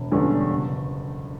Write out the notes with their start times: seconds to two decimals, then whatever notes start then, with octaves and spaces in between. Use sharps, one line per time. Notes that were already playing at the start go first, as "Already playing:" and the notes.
Already playing: E1
0.12 E2 D3 G3 C#4
0.49 F#1